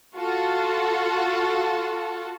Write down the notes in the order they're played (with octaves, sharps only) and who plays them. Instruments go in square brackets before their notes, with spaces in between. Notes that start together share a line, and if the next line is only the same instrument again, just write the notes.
[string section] F4 F#4 A4